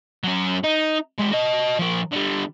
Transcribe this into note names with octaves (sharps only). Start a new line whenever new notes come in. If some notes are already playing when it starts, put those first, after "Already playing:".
F#3 C#4
D#4
G#3 G4
F#4 D#5
F3 A#4
D3 G3